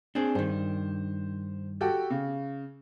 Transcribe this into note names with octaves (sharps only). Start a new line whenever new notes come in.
C4 D4 G#4
G2 D#3 C5
F#4 G4 A4
C#3